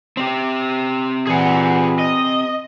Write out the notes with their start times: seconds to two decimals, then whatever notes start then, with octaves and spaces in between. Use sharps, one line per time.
0.17 C4 G4
1.27 A#2 E3 G#4 F#5
1.99 D#5